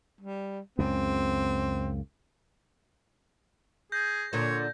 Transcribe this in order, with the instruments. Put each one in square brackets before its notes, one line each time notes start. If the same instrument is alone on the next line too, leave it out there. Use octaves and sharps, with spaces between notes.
[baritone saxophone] G3
[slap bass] C#2 F#2 C#3 [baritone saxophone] C4
[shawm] G#4 [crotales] G6 A#6
[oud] A#2 D3 D4 [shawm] C#5